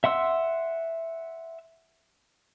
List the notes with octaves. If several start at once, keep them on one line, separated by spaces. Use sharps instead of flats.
E5 F#5 C6 E6